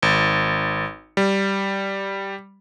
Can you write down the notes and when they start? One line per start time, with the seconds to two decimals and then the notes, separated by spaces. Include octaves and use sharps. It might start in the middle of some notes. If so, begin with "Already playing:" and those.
0.03 G#1
1.17 G3